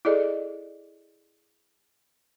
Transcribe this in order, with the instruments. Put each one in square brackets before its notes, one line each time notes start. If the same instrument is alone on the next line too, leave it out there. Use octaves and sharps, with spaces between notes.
[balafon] E4 G#4 A4 D5 D#5